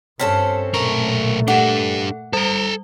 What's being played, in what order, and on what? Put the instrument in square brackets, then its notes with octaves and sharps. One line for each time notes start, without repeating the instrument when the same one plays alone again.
[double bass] G2 [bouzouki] C4 C#4 A4 [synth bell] F6 B6
[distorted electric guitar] B1 A#4 [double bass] A#2 A3 [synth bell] A#5 C#6
[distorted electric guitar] D4 G4 [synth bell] A4 [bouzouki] F#5
[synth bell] G3 [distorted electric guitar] A4 A#5